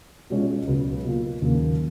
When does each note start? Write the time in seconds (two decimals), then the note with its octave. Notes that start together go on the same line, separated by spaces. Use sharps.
0.30 B2 G#3 C#4 F4
0.67 C#2 B2 F#3
1.04 B2 A#3 F4
1.42 D#2 C#3 F#3 A#3